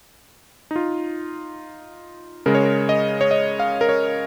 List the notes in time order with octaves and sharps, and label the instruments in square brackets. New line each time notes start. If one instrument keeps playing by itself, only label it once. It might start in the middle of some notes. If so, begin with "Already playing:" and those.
[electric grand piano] D#4
F4
C#3 G#3 A#4
C#5
A#4
D#5
C#5
D#5
F5
A#4
C#5